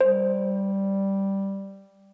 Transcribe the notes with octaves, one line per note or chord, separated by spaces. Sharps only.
G3 C5